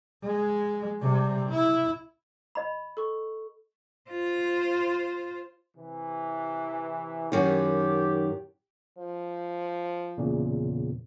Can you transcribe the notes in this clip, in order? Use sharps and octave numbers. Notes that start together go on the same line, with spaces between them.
G#3
C3 G3
E4
D#5 B5
A4 C#6
F4 C5
C3 E3
F#2 D#3 G4
F3
E2 A#2 C#3